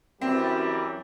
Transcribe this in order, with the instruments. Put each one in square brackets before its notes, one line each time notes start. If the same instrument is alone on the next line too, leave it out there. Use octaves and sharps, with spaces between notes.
[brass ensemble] F#2 E3 G3 [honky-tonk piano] C4